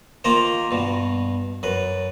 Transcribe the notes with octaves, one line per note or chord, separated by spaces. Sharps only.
D#3 A#3 F4 A#4 C5
G2 B2
F#2 B4